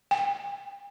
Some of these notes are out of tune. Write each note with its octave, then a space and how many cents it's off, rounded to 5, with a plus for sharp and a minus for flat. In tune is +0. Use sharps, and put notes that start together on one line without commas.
G5 +45